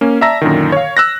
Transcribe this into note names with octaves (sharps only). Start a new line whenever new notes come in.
A#3 C#4
D5 E5 A5 A#5 E6 A#6
F#2 A#2 D3 D#3
C#5 F5
E6 F#6 A#6